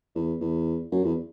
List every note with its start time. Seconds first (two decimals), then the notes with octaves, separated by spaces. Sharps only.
0.15 E2
0.41 E2
0.92 F#2
1.04 E2